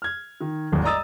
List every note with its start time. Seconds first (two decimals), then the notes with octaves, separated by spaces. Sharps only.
0.02 F6 G#6
0.41 D#3
0.72 D#1 G#1 D#2
0.84 D5 D#5 A#5 D#6 E6 A6